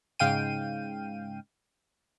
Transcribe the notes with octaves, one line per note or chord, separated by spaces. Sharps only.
G#2 C#3 F5 G5 D#7